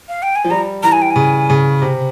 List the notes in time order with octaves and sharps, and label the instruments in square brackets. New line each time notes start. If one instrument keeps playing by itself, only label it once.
[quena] F5
G5
G#5
[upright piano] F3
[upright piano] G3 [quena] A#5
[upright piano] E3 [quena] A#5
[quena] G#5
G5
G#5
[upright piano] C#3
C#3
C3